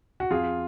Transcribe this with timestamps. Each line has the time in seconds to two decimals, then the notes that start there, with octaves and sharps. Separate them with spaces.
0.20 F#4
0.30 F2 F4 G#4